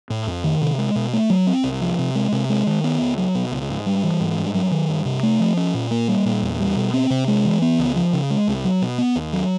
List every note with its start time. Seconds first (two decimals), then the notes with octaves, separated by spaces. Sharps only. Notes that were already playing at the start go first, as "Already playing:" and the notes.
0.10 A2
0.27 F2
0.44 D#3
0.61 C3
0.78 G#3
0.96 B2
1.13 A3
1.30 F#3
1.47 C4
1.64 C2
1.81 F3
1.99 C3
2.15 G#3
2.32 C3
2.49 G#3
2.67 D#3
2.84 B3
3.01 C#2
3.18 F#3
3.35 B2
3.52 C#2
3.69 G#2
3.86 G3
4.04 E3
4.20 G#2
4.37 G2
4.54 F#3
4.71 D#3
4.89 G2
5.05 C3
5.23 A3
5.40 F3
5.57 C#4
5.74 A#2
5.91 A#3
6.08 G3
6.25 A#2
6.42 E2
6.60 G3
6.76 B2
6.94 C4
7.10 C3
7.28 G#3
7.45 E3
7.62 B3
7.79 C#2
7.96 F3
8.13 C#3
8.30 G#3
8.48 C2
8.64 F#3
8.82 B2
8.98 B3
9.16 D#2
9.33 F#3